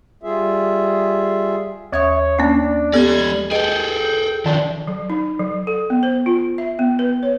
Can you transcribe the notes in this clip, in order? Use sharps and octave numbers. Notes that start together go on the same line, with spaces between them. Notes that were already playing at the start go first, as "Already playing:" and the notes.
G3 F4 G#4 E5
D#2 C#5 E5 D#6
A#3 C#4 D4
G#3 B3 G4 A4 D5 G#6
G#4 A4 B4 D#5 G5
D#3 F3 D4
F#3
D#4
F#3
A4
B3
C5
F4
E5
B3
B4
C#5